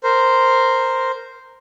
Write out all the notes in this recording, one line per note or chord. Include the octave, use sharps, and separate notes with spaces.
A#4 C5